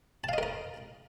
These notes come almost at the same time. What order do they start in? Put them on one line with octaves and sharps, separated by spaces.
A5 F5 D#5 A#4 A#5